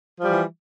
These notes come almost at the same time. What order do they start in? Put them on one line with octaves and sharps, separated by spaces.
F3 G3 E3